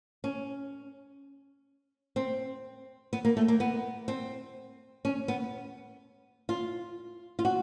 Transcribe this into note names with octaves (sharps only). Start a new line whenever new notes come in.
C#4
C4
B3
A#3
A3
A#3
B3
C4
C#4
B3
F4
F4
F#4